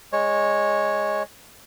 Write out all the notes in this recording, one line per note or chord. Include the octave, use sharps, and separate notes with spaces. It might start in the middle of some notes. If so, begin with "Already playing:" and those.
G#3 C#5